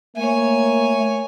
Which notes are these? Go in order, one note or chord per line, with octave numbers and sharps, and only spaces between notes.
A3 A#3 C#5 G#5